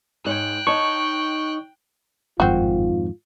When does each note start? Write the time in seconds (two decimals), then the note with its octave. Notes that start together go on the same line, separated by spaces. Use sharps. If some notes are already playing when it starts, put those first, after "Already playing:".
0.25 G#2 C#5 G5 F#6
0.67 D#4 C#5 A5 C#6
2.40 G1 F2 G#2 D#3 C4 F4 F#4